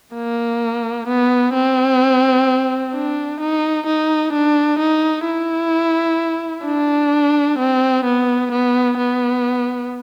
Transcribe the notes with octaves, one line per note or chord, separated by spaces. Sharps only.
A#3
B3
C4
D4
D#4
D#4
D4
D#4
E4
D4
C4
B3
B3
B3